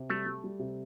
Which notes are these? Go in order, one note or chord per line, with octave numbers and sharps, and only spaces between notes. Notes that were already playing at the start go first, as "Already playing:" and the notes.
Already playing: C3
G3 A3
G3
G3
C3